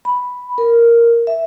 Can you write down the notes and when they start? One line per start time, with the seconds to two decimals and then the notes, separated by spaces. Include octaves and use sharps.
0.05 B5
0.58 A#4
1.27 E5